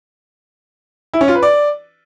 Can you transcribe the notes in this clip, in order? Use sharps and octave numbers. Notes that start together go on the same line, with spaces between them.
E4
C#4
F4
B4
D5